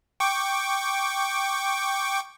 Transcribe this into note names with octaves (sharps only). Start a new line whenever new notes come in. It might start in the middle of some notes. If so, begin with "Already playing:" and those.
G5 C#6 D6